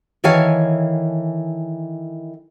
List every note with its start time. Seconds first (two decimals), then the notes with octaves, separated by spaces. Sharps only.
0.24 D#3 E3 A4 C#5 F5 G#5